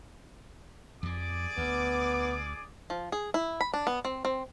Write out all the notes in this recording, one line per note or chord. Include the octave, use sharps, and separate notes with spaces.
F2 F3 G#4 D5 D6
D2 B3
F3
G#4
E4
B5
D4
B3
C4
C4